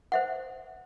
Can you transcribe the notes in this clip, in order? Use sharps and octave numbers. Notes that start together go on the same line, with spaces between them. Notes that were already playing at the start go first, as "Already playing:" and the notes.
C5 E5 F#5